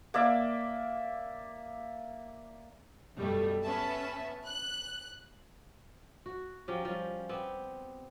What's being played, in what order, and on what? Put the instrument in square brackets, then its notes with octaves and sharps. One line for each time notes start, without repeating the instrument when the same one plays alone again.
[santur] A#3 D5 E5
[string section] F#2 B2 G3 A3
B3 C#4 B4 E5 A5
F#6
[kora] F#4
F3 F#3 C#4 G4
F3 G3 C#4
B3 C4 G4